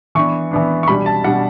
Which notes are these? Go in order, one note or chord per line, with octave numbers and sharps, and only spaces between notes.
E3 B3 D4 C#6
E3 B3 D4
C#6
B2 G3 D4 B5
A5
B2 G3 D4 F#5